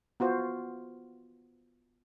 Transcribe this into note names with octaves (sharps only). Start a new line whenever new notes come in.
B3 F4 F#4 C5